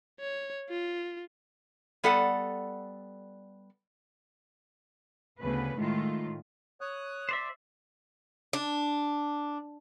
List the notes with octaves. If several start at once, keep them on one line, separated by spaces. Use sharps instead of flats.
C#5
F4
G3 B3 A4 D5 F#5
D2 C#3 B3 B4
A2 D#3 G#3 F4
C#5 D#6 F#6
C5 D5 E5
D4